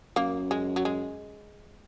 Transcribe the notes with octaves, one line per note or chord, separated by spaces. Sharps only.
F#2 A#3
G#3
F#3
G#3